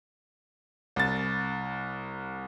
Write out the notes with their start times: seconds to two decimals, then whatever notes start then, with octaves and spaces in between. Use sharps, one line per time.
0.96 C2 A6